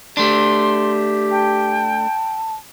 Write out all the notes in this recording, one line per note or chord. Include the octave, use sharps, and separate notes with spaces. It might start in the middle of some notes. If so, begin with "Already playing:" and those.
A3 D4 G4 C6
G5 A5